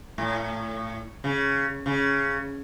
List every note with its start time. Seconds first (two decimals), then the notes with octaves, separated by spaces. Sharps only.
0.18 A2
1.24 C#3
1.86 C#3